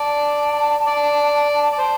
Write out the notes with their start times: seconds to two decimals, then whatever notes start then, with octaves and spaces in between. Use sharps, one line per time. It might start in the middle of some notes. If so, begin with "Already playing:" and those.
Already playing: D5 A5
0.86 D5
1.72 D5
1.78 C5